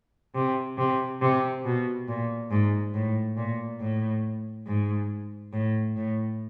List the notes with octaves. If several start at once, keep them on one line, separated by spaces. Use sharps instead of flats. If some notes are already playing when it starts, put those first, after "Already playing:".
C3
C3
C3
B2
A#2
G#2
A2
A#2
A2
G#2
A2
A2